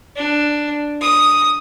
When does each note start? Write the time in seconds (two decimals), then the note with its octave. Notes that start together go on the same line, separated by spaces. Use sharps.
0.16 D4
1.01 D#6